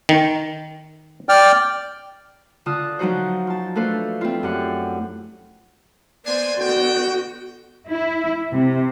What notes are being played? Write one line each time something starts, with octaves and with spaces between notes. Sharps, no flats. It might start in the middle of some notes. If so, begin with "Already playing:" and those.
D#3
D5 G5 F6
D3 F4 A5 D#6 F6 F#6
F3 F#3 D#4 F#4 C5
F4 A5
A3 D4 A4 B4 C5 F5
C4 E4 F4
F#2 G4 D5 F#5
B3 D4 C5 D5 G#5
D3 B3 F#4 G5
E4
C3